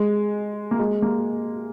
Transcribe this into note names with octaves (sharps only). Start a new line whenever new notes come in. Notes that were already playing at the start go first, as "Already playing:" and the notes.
Already playing: G#3
A#3
G#3
A#3